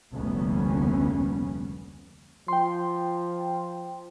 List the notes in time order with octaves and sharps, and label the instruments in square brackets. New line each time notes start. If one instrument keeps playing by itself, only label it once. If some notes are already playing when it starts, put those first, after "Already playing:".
[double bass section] F1 D2 G3 A#3 B3 C#4
[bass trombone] F3 [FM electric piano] G5 C6